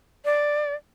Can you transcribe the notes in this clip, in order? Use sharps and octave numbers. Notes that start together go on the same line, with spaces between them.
D5